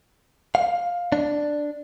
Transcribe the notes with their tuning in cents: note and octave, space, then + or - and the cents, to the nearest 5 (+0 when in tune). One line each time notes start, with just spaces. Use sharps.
F5 +10
D4 +5